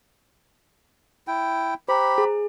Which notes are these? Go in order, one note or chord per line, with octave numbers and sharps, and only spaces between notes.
E4 G5
G4 C5 A#5 B5
G#4